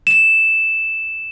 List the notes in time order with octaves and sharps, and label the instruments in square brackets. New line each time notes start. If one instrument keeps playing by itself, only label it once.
[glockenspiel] E7